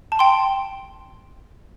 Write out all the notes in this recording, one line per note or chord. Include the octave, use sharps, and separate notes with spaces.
A5
G5 C6